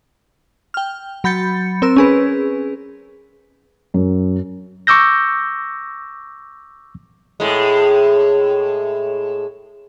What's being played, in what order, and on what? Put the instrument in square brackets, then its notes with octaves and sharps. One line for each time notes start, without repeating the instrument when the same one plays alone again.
[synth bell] G5 F6
F#3 B5 G6 A6 C#7
C4 A#4 E6
C#4 G#4 B4
[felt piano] F#2
[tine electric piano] C#6 D6 E6 G6 A#6
[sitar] A2 G#3